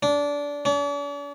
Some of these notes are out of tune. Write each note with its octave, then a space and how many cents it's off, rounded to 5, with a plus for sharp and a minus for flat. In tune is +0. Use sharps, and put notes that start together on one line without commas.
D4 -20
D4 -45